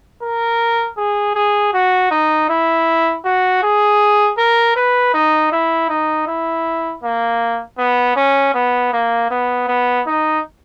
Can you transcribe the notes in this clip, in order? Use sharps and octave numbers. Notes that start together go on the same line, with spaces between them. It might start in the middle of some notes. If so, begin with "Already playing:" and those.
A#4
G#4
G#4
F#4
D#4
E4
F#4
G#4
A#4
B4
D#4
E4
D#4
E4
A#3
B3
C#4
B3
A#3
B3
B3
D#4